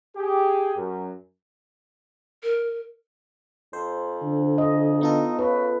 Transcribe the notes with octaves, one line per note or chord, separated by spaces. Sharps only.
G4 G#4
F#2
A#4
F2 C5
D3
D#5
B3 D#4 F4 A4
C#3 B4